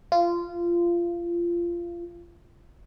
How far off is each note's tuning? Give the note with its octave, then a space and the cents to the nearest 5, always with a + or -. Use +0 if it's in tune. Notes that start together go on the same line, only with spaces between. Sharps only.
F4 -20